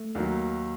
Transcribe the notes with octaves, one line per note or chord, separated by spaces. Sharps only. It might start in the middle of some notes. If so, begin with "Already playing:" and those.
Already playing: A3
D#2 D#3 F#3